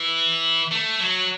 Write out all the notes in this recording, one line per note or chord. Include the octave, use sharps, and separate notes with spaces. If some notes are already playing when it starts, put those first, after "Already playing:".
Already playing: E3
A3
F#3